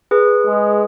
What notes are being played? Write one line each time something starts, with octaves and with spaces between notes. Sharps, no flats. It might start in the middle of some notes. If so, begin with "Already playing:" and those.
G#4 B4
G#3